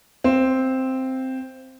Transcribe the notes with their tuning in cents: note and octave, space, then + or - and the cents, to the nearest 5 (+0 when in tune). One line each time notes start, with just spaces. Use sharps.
C4 +0 F5 -20